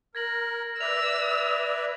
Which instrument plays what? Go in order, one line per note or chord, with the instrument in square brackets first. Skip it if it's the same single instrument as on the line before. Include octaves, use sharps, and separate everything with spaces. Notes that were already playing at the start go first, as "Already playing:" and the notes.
[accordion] A#4 [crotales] G#6 A#6 F#7
[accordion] B4 D5 E5 [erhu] E6 [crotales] F7